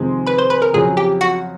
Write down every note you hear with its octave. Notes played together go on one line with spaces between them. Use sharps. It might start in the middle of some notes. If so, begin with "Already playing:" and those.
Already playing: F2 C3 D#3 G#3 C4
B4 B5
C5 C6
B4 B5
A#4 A#5
F2 C#3 F#3 G#4 G#5
G4 G5
F#4 F#5